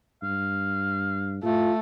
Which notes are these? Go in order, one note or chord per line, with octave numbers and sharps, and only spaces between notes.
G2 F5
A2 A3 F4